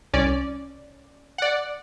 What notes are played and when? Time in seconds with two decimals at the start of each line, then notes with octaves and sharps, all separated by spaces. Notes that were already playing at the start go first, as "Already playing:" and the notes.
0.13 C2 C#4 D5
1.38 D5 F#5